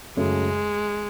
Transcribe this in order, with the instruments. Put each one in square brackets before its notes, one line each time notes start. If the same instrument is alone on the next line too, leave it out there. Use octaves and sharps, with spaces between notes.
[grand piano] F#2 C#3 F#3 A3 [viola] G#3